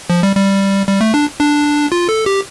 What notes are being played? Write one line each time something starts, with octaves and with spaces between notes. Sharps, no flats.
F3
G3
G3
G3
A3
D4
D4
F4
A4
G4